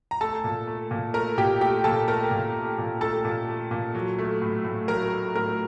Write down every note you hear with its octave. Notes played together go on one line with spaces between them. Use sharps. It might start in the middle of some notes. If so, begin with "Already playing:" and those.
A#5
A3 A4 A5
A#2
A3
A#2
A3 A#4 A#5
A#2 G4 G5
A3 G4 G5
A#2 A4 A5
A3 A#4 A#5
A#2
A3
A#2
A3 A4 A5
A#2
A3
A#2
F#3
A3
A2
A2
F#3 A#4 A#5
A3
A2 A#4 A#5